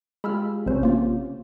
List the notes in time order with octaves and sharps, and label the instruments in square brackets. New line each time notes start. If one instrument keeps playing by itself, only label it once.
[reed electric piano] G#3 F4 G4 [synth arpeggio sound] B5 E6 F6
[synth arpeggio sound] A1 C5 [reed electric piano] C3 C#4
[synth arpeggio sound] A#3 F4